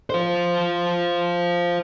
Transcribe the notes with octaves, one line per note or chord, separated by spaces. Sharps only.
F4 C5